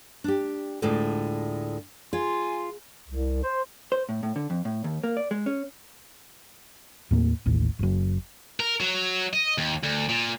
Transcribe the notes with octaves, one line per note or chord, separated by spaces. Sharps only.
D4 G4
D2 A2 G#3 F4 A4 D5
F4 G#4 G#5 C6
C2
C5
C5
A2
A2
D3
F2
A2
D#2
A#3
D5
G#3
C#4
D#2 A2 A3 A#3
A1 D#2 A2
F#1 F#2
A#4
F#3
D#5
D#2
D2
A#2